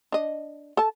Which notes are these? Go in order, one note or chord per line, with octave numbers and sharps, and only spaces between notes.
D4 D#5
A4 A5